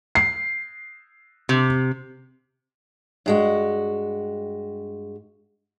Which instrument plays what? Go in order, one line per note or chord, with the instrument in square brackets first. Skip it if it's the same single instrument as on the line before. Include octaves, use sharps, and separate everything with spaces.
[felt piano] C7
[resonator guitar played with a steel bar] C3
[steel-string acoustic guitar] G2 G#3 F#4